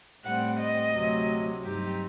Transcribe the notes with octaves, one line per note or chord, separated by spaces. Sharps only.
A2 G3 C4 F#5
D#5
D2 C3 F#3
G2 F#3 C4 D#4 G4